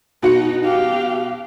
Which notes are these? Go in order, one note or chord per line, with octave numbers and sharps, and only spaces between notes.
B2 D#4 F#4 C#7
G4 F5